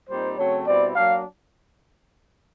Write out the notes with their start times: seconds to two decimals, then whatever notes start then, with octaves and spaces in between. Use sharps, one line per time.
0.10 A#2 G3 C4 D#4 C5
0.38 C#3 F#3 A3 C4 C#5
0.67 B2 G3 C4 E4 D5
0.96 F#3 A#3 D4 F5